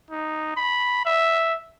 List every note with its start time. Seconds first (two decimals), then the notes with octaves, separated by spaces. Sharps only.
0.10 D#4
0.57 B5
1.05 E5